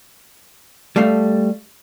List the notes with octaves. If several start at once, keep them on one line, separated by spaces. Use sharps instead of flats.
G3 A3 A4 F5